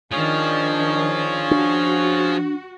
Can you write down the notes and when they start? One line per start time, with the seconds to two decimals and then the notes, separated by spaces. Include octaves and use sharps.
0.12 D#3 F3 C#4 D4 G#4 C#5
1.51 D4 F#4